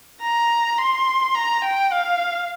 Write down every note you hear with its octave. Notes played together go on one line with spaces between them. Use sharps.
A#5
C6
A#5
G5
F5